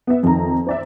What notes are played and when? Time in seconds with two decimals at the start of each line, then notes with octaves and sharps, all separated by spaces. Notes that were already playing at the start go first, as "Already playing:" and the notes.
0.07 B3 E5
0.23 F2 D#3 A#5
0.66 C5 D5 E5